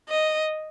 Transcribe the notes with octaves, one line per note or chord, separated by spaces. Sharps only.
D#5